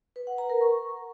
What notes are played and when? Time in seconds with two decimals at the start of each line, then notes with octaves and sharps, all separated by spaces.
0.16 B4
0.27 F#5
0.38 A#5
0.50 A#4
0.61 C#6